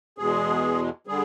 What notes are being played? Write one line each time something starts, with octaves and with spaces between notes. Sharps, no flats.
E2 B2 G#3 G#4
D3 G3 G#4